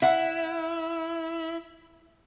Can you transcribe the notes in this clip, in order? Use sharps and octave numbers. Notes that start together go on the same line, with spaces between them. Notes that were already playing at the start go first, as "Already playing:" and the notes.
E4 E5 F#5